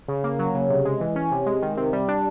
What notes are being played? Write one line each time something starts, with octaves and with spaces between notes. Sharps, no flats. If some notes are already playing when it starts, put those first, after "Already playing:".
C#3
A#3
F#3
C#3
C3
G#3
E3
C#4
C3
G#3
D#3
C3
G3
D4